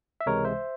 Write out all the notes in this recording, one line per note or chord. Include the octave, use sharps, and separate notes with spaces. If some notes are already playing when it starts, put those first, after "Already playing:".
E5
C#2 C3 E3 G#3 A#4 C#5
C5 E5